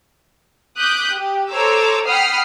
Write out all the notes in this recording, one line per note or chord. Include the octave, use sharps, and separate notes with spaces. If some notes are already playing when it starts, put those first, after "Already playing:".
D6 D#6 F#6 G6 B6
G4
A4 C5 C#5 A#5 D6 E6
F#5 G5 B5 D#6 F6 C7